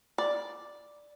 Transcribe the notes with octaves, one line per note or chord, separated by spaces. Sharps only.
D5